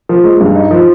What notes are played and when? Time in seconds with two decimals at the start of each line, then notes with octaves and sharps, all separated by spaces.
0.09 F3
0.24 G#3
0.41 G2
0.55 D#4
0.71 F3